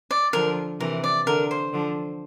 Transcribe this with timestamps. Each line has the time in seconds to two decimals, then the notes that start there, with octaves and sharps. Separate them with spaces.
0.11 D5
0.33 D3 F3 A#4
0.80 C3 E3 A#4
1.04 D5
1.27 D3 A#4
1.51 C5
1.73 D3 F3